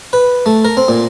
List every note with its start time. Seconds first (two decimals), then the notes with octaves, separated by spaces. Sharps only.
0.13 B4
0.46 A3
0.65 A#4
0.77 C4
0.88 A#2